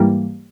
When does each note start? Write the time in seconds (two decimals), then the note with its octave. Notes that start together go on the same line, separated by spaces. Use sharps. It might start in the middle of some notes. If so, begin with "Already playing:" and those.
Already playing: G#2 E3 G3 A#3